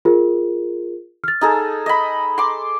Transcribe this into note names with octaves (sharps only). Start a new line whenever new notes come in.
F4 G#4 A#4
F6 A6
D#4 G#4 A4
D#5 B5
C6 D6